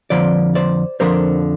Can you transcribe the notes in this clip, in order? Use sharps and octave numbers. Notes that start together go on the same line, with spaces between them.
F2 D3 F3 C5 D5
C5 D5
F2 D3 F3 A#4 C5